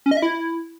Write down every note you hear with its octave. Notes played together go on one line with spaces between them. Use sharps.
C#4
D#5
E5
E4